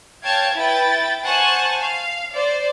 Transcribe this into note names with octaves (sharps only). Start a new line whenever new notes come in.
C#5 F5 G5 A5 G#6
E4 B4 G5 A6
C5 F#5 G#5 A5 C#6
F5
C5 D5